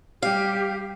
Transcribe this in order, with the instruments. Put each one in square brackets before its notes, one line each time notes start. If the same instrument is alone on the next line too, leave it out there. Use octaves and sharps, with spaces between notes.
[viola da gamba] G3 [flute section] G4 [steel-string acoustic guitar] F5